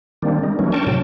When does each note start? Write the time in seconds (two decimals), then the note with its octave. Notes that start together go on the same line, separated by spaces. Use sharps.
0.22 D#3 G3 A#3 C4 D4
0.43 G3 G#3 D#4
0.59 E3 F#3 A3 A#3 C#4
0.72 D4 A#4 G5 A5 C#6
0.87 A2 C3 F#3 G5 A5